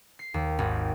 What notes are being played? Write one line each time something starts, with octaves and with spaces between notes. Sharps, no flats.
C7
D#2
G#1